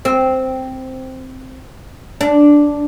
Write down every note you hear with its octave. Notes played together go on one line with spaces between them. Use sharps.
C4
D4